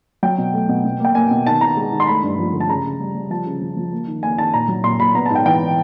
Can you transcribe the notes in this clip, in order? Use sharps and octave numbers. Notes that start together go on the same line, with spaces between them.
F#3 G5
B2
A3
B2
B2
A#3 G5
A#3 G#5
B2
D#3 A5
D#3 A#5
G#3
D#3
C6
A3 B5
G2
F3
D3
A5
C#3 A#5
C#3
G3
G3
F3 A5
C#3
F3
F3
A#3
D#3
A#3 G#5
D#3 A5
A#2 A#5
F#3
A#2 C6
A#2 B5
B3 A#5
A5
G#2 G5
E3 G5